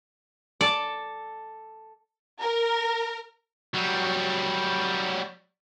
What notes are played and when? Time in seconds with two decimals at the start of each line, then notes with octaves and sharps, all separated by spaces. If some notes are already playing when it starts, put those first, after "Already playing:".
0.61 A4 D5 A5
2.40 A#4
3.74 F#3 G3